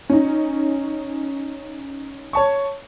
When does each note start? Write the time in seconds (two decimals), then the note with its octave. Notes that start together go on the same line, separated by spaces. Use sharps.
0.10 C#4 D#4
2.33 C#5 A5 C#6